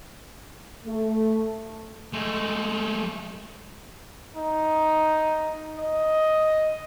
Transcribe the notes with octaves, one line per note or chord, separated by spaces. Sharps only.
A3
G#3 A3
D#4
D#5